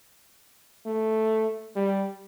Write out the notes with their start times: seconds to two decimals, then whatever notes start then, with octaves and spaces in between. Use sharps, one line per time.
0.86 A3
1.76 G3